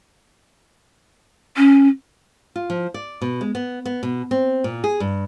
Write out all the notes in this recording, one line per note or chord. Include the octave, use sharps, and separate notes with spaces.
C#4
F4
F3
D5
B2
G#3
B3
B3
B2
C4
A#2
G#4
G2